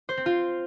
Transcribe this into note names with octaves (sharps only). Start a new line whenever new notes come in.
C5
C4
F4